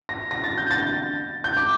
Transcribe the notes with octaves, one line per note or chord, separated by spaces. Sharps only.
A#6
A#6
A6
G6
A6
G6
D6